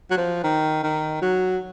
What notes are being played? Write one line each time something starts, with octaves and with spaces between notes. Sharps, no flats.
F#3
F3
D#3
D#3
F#3